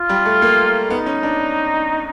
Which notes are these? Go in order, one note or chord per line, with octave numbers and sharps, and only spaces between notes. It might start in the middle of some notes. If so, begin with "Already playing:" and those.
Already playing: F4
G3
A3
A#3
B3 D#4
C#4
D4